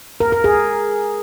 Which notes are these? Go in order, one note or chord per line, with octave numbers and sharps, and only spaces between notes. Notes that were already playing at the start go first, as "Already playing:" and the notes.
A#4
A#4
G#4